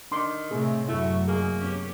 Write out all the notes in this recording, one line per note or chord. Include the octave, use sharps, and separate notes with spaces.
D#3 D4 C6 D6
A2 C3 C4 G#4
F#2 A3 E4 F#4
A#3 G#4
B3 C#4 G4